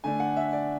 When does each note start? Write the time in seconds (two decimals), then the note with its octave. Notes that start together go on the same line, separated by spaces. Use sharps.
0.04 D3 A3 D4 G#5
0.20 F#5
0.37 E5
0.53 D5